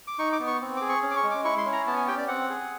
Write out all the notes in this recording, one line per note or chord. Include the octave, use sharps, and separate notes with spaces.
D6
D#4 C#6
D6
B3
C#6
C4
G#4 D6
C#6
C#4
D6
C#6
G#3
D6
E4 C#6
C6
C#4
A#5
B3 A5
G#5
G4 G5
D5
C4 F#5
G#4